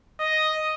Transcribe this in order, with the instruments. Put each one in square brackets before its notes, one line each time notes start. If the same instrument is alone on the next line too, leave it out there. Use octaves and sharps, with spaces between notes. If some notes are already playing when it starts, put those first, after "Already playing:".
[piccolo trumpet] D#5